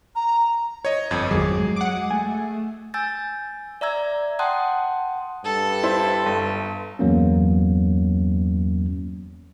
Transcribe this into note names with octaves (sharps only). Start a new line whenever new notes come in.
A#5
C#5 D#5
G1 F2 D6 G#6
G#1 F2 F#3 G#4 D6
G#3
F#5 D6
A3 G#5
G#5 E6 G6 A6
D5 E5 A#5 E6 G#6
F#5 G5 A5 C6 D#6 F#6
G2 A4
E4 C5
G1
E2 G2 F#3 A#3 C#4